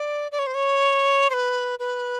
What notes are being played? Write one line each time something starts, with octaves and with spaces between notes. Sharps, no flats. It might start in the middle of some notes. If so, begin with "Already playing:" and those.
Already playing: D5
D5
C#5
C5
C#5
C5
B4
B4